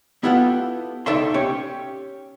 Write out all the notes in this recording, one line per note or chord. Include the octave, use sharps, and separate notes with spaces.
B3 E4 F4 G4 A4 F#5
C#2 D#4 A4 D5 E5 C6
C#4 G4 C#5